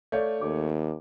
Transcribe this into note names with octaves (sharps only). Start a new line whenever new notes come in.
A3 C#5 D5 F5 G6
D#2 D6